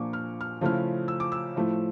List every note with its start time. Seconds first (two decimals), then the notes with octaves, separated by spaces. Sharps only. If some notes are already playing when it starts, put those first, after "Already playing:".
Already playing: A#2 F3 A#3 D4 C#6 D6
0.13 F6
0.41 F6
0.61 C#3 F3 A3 C#4 E4 F6
1.08 E6
1.20 D6
1.32 E6
1.56 A2 F3 A3 E4